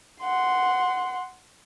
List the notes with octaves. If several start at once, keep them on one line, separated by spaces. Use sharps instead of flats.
F#5 C6